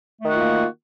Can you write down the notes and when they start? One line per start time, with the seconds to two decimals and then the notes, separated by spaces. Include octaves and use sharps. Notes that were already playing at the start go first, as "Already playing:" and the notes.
0.20 A3
0.24 D#3
0.29 F#4
0.33 F4
0.37 A#3